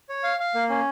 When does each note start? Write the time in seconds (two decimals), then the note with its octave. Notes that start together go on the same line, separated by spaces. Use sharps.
0.09 C#5
0.23 F5
0.40 F5
0.55 A#3
0.69 C#4